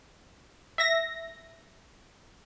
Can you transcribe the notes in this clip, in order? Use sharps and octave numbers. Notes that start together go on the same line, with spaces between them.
E5 A#6